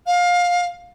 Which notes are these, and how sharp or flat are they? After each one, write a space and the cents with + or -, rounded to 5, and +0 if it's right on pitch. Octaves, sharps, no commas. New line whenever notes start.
F5 +20